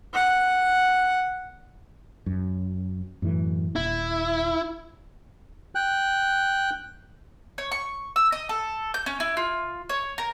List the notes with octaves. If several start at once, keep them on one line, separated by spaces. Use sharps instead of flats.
F#5
F#2
F#2 A2 E3
D#1 E4
G5 F#6
C#5
C#6
E6
D#5
A4
G6
C#4
E4
F4
C#5
A#4